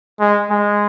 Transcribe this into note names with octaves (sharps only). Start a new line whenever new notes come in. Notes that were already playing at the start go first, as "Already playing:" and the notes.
G#3
G#3